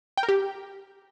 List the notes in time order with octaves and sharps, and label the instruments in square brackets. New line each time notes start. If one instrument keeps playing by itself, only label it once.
[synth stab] G5
A#4
G4